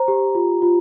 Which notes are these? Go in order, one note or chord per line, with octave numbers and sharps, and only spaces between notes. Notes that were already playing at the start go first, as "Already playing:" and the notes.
Already playing: C5 A#5
G4
F4
F4